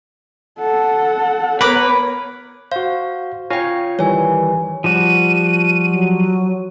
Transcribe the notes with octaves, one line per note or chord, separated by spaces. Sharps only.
A4 F#5
B3 A#4 B4 C#5 D6
F#4 C5 F5
F4 C#5 F5 G5 G#5
D#3 E3 G3 C#5 G#5
F3 G3 F#4 D#7
F#3